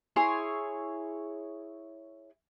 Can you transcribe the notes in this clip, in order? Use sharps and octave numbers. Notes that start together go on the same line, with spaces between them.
E4 G#4 C#5 C6